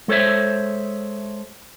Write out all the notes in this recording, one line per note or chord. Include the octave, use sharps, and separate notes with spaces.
G#3 A4 C5 C#5 E5